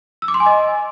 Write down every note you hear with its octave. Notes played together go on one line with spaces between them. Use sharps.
E6
D6
C6
G#5
D#5